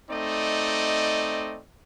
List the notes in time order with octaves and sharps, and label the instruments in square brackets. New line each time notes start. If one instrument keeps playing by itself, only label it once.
[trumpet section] A3 C4 D#4 D5 D#5